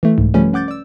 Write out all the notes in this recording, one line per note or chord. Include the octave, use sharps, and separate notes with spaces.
E3 A3
C2 G#2
C#3 F3 G3 A3 C#4 B4
C#4 F#5 D6 G6 A6
D5 E6